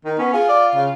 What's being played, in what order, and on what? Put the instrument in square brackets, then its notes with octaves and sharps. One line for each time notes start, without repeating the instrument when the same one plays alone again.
[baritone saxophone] D#3
[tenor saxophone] B3 [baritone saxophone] C#4
[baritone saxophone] F4 [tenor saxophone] G#4
[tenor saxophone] D5
C#3